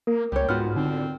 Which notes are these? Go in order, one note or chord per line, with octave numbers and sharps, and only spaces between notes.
A#3 A#4
C#2 G3 C#5 G5
G#2 B3 F4 F#4 F6
D3 C4 D#4